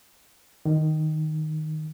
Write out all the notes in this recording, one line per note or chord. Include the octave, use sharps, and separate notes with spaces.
D#3